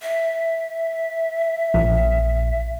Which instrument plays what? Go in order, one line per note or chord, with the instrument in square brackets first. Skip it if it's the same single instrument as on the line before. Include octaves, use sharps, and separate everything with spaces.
[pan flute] E5
[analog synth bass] A#1